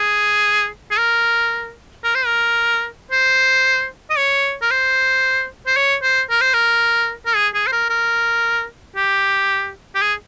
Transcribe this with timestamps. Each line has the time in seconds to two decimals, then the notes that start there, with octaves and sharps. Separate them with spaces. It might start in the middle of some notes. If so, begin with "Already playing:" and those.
Already playing: G#4
0.91 G#4
0.98 A#4
2.04 A#4
2.15 C5
2.26 A#4
3.11 C5
4.10 D#5
4.18 C#5
4.62 A#4
4.71 C5
5.67 C5
5.77 C#5
6.03 C5
6.30 A#4
6.41 C5
6.54 A#4
7.26 A#4
7.36 G#4
7.55 G#4
7.67 C5
7.72 A#4
7.89 A#4
8.96 G4
9.95 G4
10.02 G#4